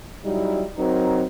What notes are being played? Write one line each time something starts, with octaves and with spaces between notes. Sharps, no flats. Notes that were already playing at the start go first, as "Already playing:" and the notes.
F#3 G3 D#4 E4
F#3 C4 D#4 A#4